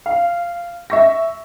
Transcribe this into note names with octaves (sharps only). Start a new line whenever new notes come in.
F5
E5 C#6 A#6